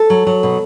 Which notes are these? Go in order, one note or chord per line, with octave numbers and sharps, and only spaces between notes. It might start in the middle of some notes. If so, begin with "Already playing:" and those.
Already playing: A4
F#3
F#3
B2